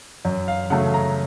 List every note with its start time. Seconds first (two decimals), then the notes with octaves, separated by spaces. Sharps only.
0.25 F#2
0.48 F5
0.70 C#3 F#3 A3 F#5
0.94 A#5